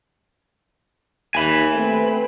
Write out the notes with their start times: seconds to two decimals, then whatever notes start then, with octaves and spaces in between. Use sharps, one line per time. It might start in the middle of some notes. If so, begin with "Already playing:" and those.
1.35 D#2 G#5 B5
1.74 A3 C4 B4